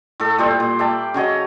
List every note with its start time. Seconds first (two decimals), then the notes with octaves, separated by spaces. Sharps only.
0.20 A2 A4
0.38 A#2 G3 C5
0.60 A#2
0.79 D5 E5 G5 A5
1.14 C#3 F#3 C#5 D#5